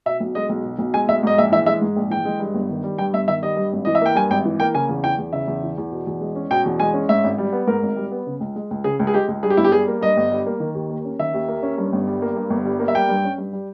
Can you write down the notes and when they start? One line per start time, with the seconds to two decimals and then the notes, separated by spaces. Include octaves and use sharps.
0.06 B2 E5
0.20 B1
0.35 G#3 D#5
0.50 B1
0.65 B2
0.79 B1
0.94 G#3 G#5
1.08 B1 E5
1.23 G#2 D#5
1.38 A#1 E5
1.52 E3 E5
1.66 G#3 E5
1.81 G#2
1.96 A#1
2.10 E3 G5
2.25 G#3
2.40 G2
2.54 G1
2.70 D#3
2.84 G3
2.98 G2 G5
3.13 G1 E5
3.28 D#3 E5
3.42 G3 D#5
3.57 G2
3.73 G#1
3.85 E3 D#5
3.95 E5
4.01 A#3 G5
4.15 G2 G#5
4.30 G#1 G5
4.45 E3
4.60 A#3 G5
4.74 C#3 G#5
4.89 E2
5.04 E3 G5
5.18 E2
5.33 C#3 E5
5.48 E2
5.63 E3
5.78 E2
5.91 B2
6.07 E2
6.21 G#3
6.35 C#4
6.51 B2 G5
6.65 E2
6.80 G#3 G#5
6.94 C#4
7.09 G#2 E5
7.24 G#1
7.38 G3
7.53 B3
7.67 G#2 A#4
7.83 G#1
7.96 G3
8.12 B3
8.27 C#3
8.40 C#2
8.56 G#3
8.71 C#2
8.84 C#3 G#4
8.99 C#2
9.07 G#4
9.14 G#3 G4
9.28 C#2
9.43 G2 G#4
9.50 G4
9.57 G1 E4
9.64 G4
9.72 G3 G#4
9.88 A#3
10.01 G2 D#5
10.17 G1
10.31 G3
10.46 A#3
10.60 D#3
10.75 D#2
10.90 A#3
11.05 C#4
11.19 D#3 E5
11.34 D#2
11.48 A#3
11.63 C#4
11.78 G2
11.93 G1
12.07 G3
12.22 A#3
12.36 G2
12.50 G1
12.66 G3
12.80 A#3
12.88 E5
12.95 G3 G5
13.09 G2
13.25 C#4
13.38 G2
13.53 G3